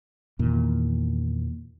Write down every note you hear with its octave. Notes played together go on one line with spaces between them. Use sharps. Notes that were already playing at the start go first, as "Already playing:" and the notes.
E2 A#2 D#3